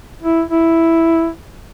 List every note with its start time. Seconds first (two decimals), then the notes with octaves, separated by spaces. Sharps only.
0.22 E4
0.50 E4